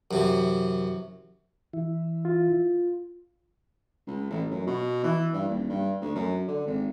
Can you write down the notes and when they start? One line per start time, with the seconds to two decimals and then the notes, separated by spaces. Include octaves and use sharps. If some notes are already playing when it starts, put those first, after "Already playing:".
0.11 F#2 C3 E3
1.73 E3 E4
2.25 F4
4.07 C#2
4.30 A1
4.51 F#2
4.67 B2
5.04 E3
5.33 G2
5.48 D#1
5.69 G2
6.02 D2
6.15 F#2
6.48 D3
6.66 G#1